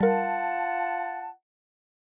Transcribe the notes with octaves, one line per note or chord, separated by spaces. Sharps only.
G3 F4 A#4 F#5 A5